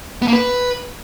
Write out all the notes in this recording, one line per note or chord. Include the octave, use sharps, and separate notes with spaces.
B3
A#3
B4